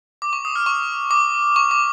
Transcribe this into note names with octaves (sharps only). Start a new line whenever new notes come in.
D6
C#6
D#6
F6
C#6
D6
C#6
D6